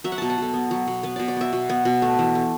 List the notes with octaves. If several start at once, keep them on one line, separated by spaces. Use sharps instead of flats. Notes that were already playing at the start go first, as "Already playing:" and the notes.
F#3 E5
F#5
B2 A5
F#5
B2 A4
B3
F#3
B2
B3 B4
B2 D5
D5
B3 E5
B2
B3
B2
A3
E3
A3